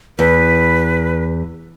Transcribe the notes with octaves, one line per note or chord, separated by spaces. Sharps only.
E2 B4